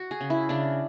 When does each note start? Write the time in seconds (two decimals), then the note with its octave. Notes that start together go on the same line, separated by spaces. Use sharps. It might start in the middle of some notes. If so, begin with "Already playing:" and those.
Already playing: F#4
0.11 G#4
0.21 C#3
0.30 E4
0.49 C#3 D4